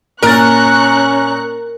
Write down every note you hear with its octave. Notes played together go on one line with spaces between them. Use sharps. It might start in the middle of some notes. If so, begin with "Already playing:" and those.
A#2 C#4 A#4 A#5 C#6 F#6 A6